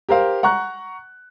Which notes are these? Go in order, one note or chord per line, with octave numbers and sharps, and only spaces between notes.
G4 A#4 C5 F5
F#5 A#5 C#6 F#6